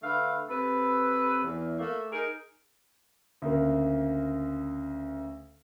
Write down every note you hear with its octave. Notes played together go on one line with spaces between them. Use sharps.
D3 A3 B4 F5
C3 A4 B4
E2
A3 A#3
D#4 G#4 A#4
D2 C#3 A#3